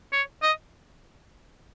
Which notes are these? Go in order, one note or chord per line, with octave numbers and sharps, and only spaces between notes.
C#5
D#5